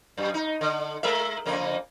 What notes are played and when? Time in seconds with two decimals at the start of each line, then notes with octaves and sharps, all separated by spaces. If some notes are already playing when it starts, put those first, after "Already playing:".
0.17 F#2
0.34 D#4
0.61 D3
1.03 G#3 A#4 E5
1.46 F2 C#3 A#3